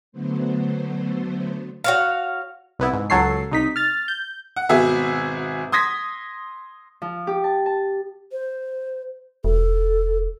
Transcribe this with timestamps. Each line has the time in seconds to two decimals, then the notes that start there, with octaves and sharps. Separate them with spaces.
0.12 D3 F#3 A3 B3 C5
1.84 F#4 C#5 F5
2.79 C2 B3 E4
2.93 G#2
3.10 C#2 F#3 A4 C#5 C7
3.51 C2 D#4 B6
3.76 F6 A6
4.08 G6
4.56 F#5
4.69 G#1 B2 B3 F#4 G#4 E5
5.72 C6 D#6 G#6 A#6 B6
7.02 F3
7.27 G4
7.44 A5
7.66 A5
8.32 C5
9.44 E1 A4